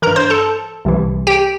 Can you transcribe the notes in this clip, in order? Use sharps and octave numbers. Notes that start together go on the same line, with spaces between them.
G2 E3 A#4 A#5
C5 C6
A4 A5
C2 C3 E3
G4 G5